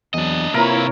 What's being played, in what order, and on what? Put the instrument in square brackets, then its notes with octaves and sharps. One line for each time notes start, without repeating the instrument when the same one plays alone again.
[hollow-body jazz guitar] E2 F#3 [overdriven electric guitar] D4 D#5
[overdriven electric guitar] C3 B4 [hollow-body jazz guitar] A#3 F4 [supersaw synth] E4 C#5 [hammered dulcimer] A#4